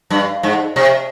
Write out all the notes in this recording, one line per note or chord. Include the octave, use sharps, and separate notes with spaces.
G2
G#2
C3